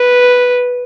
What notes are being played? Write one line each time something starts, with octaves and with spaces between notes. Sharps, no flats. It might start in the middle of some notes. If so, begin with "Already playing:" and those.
Already playing: B4